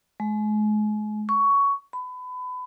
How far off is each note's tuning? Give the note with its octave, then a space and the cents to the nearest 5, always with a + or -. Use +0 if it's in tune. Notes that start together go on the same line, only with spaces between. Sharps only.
G#3 +35
C#6 +15
B5 +25